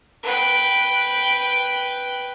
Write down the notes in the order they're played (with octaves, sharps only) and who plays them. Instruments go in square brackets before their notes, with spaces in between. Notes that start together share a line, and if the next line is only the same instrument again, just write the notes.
[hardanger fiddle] B4 G5